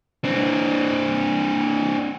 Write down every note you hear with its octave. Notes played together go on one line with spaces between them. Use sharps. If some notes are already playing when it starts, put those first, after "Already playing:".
C4 D4